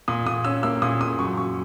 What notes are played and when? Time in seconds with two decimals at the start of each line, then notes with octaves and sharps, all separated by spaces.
0.08 A#2 D#6
0.26 A#2 D#6
0.44 C#4 E6
0.63 A#3 E6
0.82 A#2 D#6
1.01 A#2 D#6
1.19 F#2 C#6
1.37 F#2 C#6